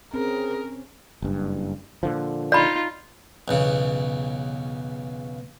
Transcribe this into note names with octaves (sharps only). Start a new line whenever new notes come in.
C4 C#4 G#4 A#4
F#1 G2
A#2 D3 F3
D#4 F4 D5 B5
B1 E2 C#3